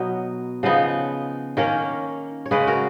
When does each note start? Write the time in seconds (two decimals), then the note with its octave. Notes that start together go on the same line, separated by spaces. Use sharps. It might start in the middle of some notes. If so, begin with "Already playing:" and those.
Already playing: B2 F#3 B3 D#4
0.63 C#3 F3 B3 D#4
1.57 D#3 A#3 C#4 A#4 C#5
2.46 C#5
2.51 C#3 G#3 C#4 G#4 B4
2.67 F#4 A#4